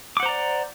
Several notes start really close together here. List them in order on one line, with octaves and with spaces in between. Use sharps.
D6 F#5 C5 A#5 D5